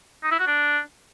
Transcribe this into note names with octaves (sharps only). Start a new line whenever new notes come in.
D#4
E4
F#4
D4